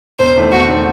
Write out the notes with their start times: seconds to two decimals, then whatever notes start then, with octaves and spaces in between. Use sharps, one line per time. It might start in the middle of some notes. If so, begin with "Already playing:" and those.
0.19 E1 C5
0.36 E2 D#3 A3 C4
0.52 E1 F#4
0.69 D#3 A3 C4